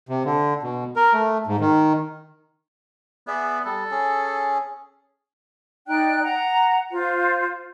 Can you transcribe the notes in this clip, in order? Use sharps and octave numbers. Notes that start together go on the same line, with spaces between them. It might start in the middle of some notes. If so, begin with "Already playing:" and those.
C3
D3
B2
A#4
A3
G#2
D#3
B3 G#4 D5 E5
G3 A4
C#4 G#4
D#4 D5 G5 F#6
F#5 A#5
F4 C5